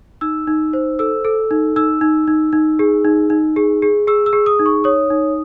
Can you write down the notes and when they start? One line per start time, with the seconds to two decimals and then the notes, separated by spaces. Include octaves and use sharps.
0.21 D#4 E6
0.47 D#4
0.73 C5
0.99 A4 E6
1.25 A4
1.51 D#4
1.76 D#4 E6
2.01 D#4
2.28 D#4
2.53 D#4
2.79 G#4
3.05 D#4
3.30 D#4
3.56 G#4
3.82 G#4
4.07 G#4 E6
4.26 E6
4.33 G#4
4.46 D#6
4.59 D#4
4.66 C#6
4.84 C#5 D#6
5.10 D#4